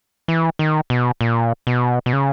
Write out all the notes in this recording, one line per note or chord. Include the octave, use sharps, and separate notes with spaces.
E3
D#3
B2
A#2
B2
B2
C#3